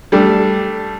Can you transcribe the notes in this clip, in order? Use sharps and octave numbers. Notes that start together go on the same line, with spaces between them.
G3 A3 D4